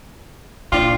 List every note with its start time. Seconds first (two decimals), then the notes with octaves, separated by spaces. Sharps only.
0.72 A#2 D4 F4 D5 G5